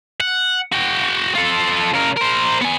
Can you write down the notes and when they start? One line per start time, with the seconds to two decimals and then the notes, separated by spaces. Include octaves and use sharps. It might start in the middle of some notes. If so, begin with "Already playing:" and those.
0.21 F#5
0.72 F#4 G5
1.35 F4 A4
1.93 C#3 A#4
2.16 A#4 C5
2.61 B3 G#5